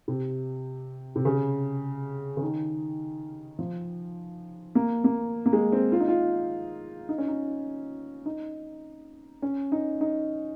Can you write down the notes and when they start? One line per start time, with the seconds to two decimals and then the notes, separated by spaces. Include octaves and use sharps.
0.08 C3
1.16 C3
1.25 C#3
2.37 C#3
2.41 D#3
3.59 F3
4.75 A#3
5.04 A#3
5.46 A#3
5.53 G#3
5.72 C4
5.92 F4
6.00 D#4
6.08 F4
7.09 D#4
7.18 C#4
7.28 D#4
8.26 D#4
9.42 C#4
9.72 D#4
10.01 D#4